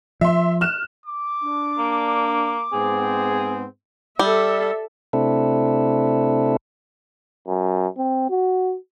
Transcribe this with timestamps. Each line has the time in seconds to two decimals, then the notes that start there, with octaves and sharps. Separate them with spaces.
0.21 F3 E5 C6
0.61 F6 F#6 E7
1.06 D6
1.43 D4
1.78 A#3
2.73 G#2 B3 C4 G#4
4.19 G3 A4 E5
5.13 C3 A3 C4 D4 E4 A4
7.47 F#2
7.97 C4
8.30 F#4